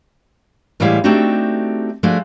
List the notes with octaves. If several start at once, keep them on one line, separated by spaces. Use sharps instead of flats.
A2 E3 G3 G#3 E4 F5
A3 C4 D4 D#4 F#4 G4
F3 G#3 A3 D4 F#4